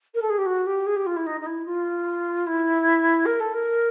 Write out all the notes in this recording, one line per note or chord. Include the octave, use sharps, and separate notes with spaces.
A#4
A4
G#4
G4
F#4
G4
G#4
G4
F4
E4
D#4
D#4
E4
F4
E4
A#4
A4
A#4